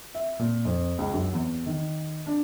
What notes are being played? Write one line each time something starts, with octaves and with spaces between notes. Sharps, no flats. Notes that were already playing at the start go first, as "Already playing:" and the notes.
E5
A#2
F2
C#2
F#2
E2
D#3
D4